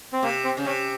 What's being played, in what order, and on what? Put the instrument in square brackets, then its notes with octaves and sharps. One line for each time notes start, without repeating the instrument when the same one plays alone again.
[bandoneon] C4
[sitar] C3 [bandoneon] A#3
[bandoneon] C4
[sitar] C#3
[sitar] C3 [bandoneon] C#4